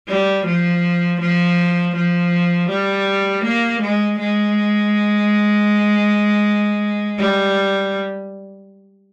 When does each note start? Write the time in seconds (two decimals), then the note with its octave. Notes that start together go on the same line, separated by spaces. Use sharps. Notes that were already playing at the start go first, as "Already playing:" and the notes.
0.08 G3
0.46 F3
1.21 F3
1.95 F3
2.70 G3
3.44 A#3
3.82 G#3
4.19 G#3
7.18 G3